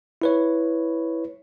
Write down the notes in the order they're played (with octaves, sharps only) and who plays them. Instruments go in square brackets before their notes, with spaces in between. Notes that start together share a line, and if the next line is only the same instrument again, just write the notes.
[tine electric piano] E4 B4 C#5